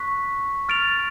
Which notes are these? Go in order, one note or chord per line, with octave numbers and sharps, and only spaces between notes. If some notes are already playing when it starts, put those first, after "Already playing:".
Already playing: C#6 F#6 B6
F6 A6 D7 F7